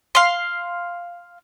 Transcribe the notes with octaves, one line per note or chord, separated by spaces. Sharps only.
F5 C6